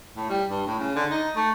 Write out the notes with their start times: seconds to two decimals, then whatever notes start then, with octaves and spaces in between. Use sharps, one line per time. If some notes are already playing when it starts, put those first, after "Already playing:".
0.16 A2
0.29 G3
0.49 G2
0.67 A2
0.79 C#3
0.95 D3
1.11 D#4
1.36 A3